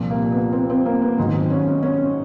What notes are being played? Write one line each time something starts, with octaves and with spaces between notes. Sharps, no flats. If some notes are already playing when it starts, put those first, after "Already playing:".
Already playing: C2 A#2 F3
A#3
B3
C4
C4
A#3
B3
G#2 D#3 F#3 C4
C#4
C#4